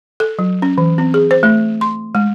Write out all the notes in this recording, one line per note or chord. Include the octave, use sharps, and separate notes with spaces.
A4
F#3
C#4
E3
C4
G#4
C5
A3
C6
G#3